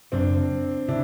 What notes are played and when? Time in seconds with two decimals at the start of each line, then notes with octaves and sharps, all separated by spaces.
0.12 F#2 C#3 F#3 C4 D4
0.88 C#3 D4 E4